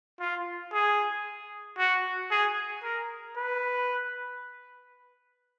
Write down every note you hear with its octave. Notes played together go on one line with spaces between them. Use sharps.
F4
G#4
F#4
G#4
A#4
B4